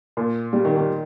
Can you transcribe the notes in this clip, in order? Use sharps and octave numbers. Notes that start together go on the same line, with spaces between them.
A#2
G3
D#3
D#3